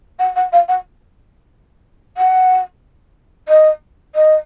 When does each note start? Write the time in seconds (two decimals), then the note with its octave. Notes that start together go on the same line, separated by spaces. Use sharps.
0.19 F#5
0.36 F#5
0.52 F5
0.68 F#5
2.17 F#5
3.48 D#5
4.15 D#5